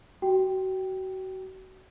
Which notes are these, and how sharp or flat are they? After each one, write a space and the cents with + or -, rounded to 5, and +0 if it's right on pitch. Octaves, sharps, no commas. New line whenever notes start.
F#4 +30 G5 +0